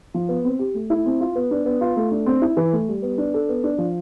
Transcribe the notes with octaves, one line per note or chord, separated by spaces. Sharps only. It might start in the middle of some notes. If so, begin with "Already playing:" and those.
F3
B3
C4
G4
A3
E4
C4
F4
B3
D4
B3
F4
A3
D4
C4
E4
E3
A3
G3
B3
D4
A4
B3
D4
F3